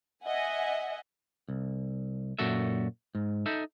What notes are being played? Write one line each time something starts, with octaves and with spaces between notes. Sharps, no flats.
D#5 E5 F#5 G#5
C2
F#2 A#2 F#4 A4 E5
G#2
D#4 A4 E5